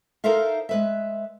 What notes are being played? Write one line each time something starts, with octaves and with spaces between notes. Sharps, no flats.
D#4 A4 A#4 C5 E5 F5
G#3 B4 E5